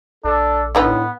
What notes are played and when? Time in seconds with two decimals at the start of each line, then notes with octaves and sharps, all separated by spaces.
0.24 A#1 D4 A4
0.75 A2 D3 B3 D#4 B4